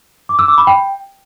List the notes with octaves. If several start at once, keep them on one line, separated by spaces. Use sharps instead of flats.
D6
E6
D6
B5
G5